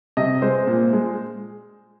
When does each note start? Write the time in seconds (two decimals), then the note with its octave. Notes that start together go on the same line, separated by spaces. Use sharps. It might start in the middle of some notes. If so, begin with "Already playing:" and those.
0.17 C3 D#5
0.42 G#3 C5
0.67 A#2
0.93 G#3